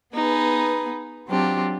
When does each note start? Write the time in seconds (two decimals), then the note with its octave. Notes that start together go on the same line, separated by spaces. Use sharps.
0.14 B3 D#4 G#4 B4
1.29 F#3 C4 D4 F4 G4